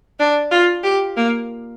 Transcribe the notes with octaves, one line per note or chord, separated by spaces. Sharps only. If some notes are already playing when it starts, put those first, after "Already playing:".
D4
F4
G4
A#3